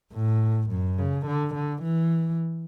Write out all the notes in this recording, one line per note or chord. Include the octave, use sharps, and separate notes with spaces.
A2
F#2
C#3
D3
D3
E3